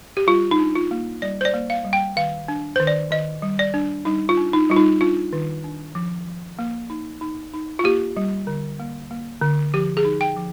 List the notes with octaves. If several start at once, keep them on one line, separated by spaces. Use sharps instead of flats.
G4
G3 F4
D#4
D4
F4
A#3
G3 D5
C5
D5
A#3
F5
G3
G5
D#3 F5
D4
D#3 C5
D5
D#3 D#5
G3
D5
D4
G3 D#4
F4
D4
D#4
G3 F4
D#4
D4 F4
D#3
D4
F3
F3
A#3
D#4
D#4
D#4
F4
A#3 G4
G3
D3
A#3
A#3
D3
F3 G4
G#4
D#4
G5
F3